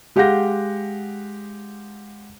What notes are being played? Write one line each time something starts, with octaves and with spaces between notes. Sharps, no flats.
G#3 G4 F5 F#5 G6 A#6